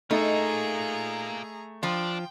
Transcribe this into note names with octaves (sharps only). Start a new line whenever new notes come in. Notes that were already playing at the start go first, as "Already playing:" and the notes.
A3 D#4 F4 G#4 A#4 A#5
F3 D4 F4 G5